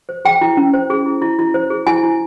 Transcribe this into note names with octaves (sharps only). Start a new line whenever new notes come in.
C5
G#4 G5
E4
C#4
C5
G#4
E4
E4
E4
C5
G#4
E4 G#5
E4